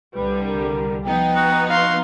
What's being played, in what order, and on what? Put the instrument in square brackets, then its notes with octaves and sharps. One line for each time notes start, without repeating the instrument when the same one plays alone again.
[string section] C2 D3 G3 [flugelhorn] B4
[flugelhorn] A#4
[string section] F3 B3 D#4 [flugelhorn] G5
[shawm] F#4
[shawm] F#4 [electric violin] F5 C6